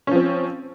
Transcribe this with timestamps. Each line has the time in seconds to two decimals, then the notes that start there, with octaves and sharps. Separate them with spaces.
0.07 C#4
0.11 F3
0.15 C4